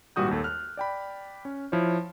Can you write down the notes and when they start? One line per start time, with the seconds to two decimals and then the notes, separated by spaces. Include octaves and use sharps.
0.16 G#1 A#2 G3 F#4 D#6 G6
0.31 D#2 A4
0.44 F6 F#6
0.77 D5 G5 B5
1.45 C#4
1.72 F3 E4 C#5